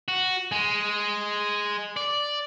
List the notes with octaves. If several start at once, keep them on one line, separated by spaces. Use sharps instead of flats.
F#4
G#3
D5